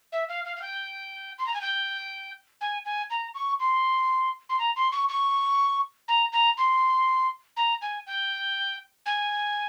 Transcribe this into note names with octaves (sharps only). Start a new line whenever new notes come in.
E5
F5
F5
F5
G5
C6
A#5
G#5
G5
G#5
G#5
A#5
C#6
C6
C6
A#5
C6
C#6
C#6
A#5
A#5
C6
A#5
G#5
G5
G#5